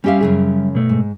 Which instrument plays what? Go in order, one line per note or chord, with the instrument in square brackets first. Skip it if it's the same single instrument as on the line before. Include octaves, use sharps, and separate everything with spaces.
[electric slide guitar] G3 E5 [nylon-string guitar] C#4 G4 F5
[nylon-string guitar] F#2 C#3 G#4
[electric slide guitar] B2 A3
[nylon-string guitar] G#2